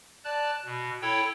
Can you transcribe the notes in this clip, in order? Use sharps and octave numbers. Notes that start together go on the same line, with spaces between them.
D5 A5 F#6
B2
E4 A4 C#5 G5